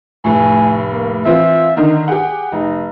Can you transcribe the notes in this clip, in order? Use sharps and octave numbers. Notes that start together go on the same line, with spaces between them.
F1 A2 G#5
A#3
E3 C4 F4 E5
D3 D#3 D#4
G4 G#4 F#5
F1 D#4